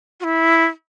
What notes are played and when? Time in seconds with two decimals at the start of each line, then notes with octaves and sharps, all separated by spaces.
0.20 F#4
0.24 E4